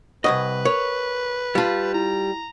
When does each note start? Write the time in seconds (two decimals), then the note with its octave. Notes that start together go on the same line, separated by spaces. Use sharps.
0.24 C2 F2 B4 D#5 F#5 C#6 D#6
0.65 A#4 C#5 C#6 F7
1.55 G3 F4 F5 A5
1.94 E4 A#5